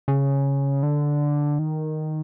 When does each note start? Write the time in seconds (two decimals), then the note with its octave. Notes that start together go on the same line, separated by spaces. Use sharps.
0.08 C#3
0.83 D3
1.59 D#3